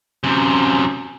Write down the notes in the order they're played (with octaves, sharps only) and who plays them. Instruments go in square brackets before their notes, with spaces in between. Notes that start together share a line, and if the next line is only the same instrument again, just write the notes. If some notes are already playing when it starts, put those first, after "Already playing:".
[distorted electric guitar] F#2 C3